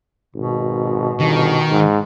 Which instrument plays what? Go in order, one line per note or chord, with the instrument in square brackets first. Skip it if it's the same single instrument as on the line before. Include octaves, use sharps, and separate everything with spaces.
[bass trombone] G#1 [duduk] B2
[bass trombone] G1 [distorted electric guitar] D#3
[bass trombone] G#2